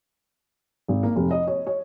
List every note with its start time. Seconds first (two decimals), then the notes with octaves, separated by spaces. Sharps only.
0.88 G#1
1.03 A#3
1.16 F1
1.31 D#5
1.47 C#5
1.67 C#5